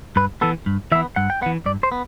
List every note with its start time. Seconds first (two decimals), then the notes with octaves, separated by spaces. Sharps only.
0.16 G2 B4
0.41 E3 B3 A4
0.66 G2
0.92 E3 E5
0.95 B3
1.16 G2 F#5
1.30 G5
1.42 B3 F#5
1.46 E3
1.66 G2 D5
1.83 C5
1.92 B3